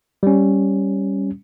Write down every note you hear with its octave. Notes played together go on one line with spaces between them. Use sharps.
G3 C#4